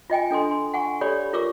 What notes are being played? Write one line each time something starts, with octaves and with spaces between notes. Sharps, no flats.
F4 D#5 G5 G#5
D4 A4 G#5 C6
C6
F#5 G#5 C#6
G4 A4 C#5 D5 B5
F4 A#4 C#6 D6 E6